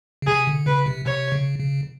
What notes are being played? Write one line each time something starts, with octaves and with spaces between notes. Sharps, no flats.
C#3
C3 G#4
D3
C#3 B4
C3
C3 C#5
C#3
C#3